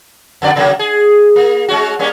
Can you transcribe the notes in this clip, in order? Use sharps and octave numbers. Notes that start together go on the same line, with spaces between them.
F2 D3 D5
C3 F#3 A#3
G#4
A#3
G#3 C#4 F#4
G3 A#3 C#4